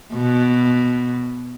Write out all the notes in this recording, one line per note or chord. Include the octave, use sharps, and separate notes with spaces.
B2